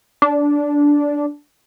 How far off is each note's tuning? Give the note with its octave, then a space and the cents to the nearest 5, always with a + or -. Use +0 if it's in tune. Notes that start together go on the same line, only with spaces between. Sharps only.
D4 -10